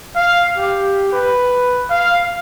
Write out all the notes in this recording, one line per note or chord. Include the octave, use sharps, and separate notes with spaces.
F5
G4
B4
F5